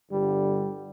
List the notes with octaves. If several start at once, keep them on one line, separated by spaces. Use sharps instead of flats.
G1 G2 D3 G3